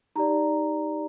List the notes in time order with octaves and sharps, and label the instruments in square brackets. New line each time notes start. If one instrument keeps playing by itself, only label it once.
[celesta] D#4 G4 D5 A#5